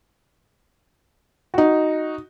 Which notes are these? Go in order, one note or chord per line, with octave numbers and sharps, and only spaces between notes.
D#4 F#4